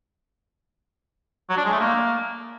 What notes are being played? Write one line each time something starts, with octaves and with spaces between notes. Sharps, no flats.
F#3
D4
G#3
A3
A#3